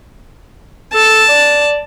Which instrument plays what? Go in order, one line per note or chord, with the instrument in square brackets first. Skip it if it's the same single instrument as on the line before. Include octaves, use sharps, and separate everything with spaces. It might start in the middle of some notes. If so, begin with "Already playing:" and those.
[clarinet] A4 [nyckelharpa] A5
[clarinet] D5